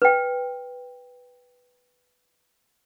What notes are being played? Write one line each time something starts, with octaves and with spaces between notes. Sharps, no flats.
B4 G5